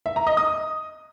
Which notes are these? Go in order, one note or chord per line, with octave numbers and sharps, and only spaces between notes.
E5
A#5
D#5
D#6